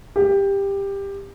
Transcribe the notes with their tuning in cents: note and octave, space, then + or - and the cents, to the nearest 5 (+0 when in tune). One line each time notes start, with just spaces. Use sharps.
G4 +15